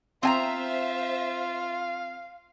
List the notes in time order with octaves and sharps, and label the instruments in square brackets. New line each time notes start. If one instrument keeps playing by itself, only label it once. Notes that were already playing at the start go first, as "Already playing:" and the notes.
[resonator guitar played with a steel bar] C4 G#5 A#5 [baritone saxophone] F4 [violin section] C5 E5 [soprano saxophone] F5